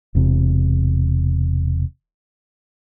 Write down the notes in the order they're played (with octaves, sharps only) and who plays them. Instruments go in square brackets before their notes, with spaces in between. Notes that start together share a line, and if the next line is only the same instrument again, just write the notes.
[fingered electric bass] E1 E2 C3